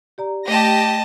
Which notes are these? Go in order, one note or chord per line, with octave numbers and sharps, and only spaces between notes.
G4 D5 A#5
A3 G4 D#5 A5 A#6